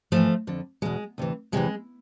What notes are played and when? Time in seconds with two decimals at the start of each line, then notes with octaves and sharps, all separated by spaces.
0.12 G#2 E3 F3 A3
0.47 F2 D3
0.82 E2 B2 G#3
1.18 D2 C3 E3
1.52 E2 C3 E3 G#3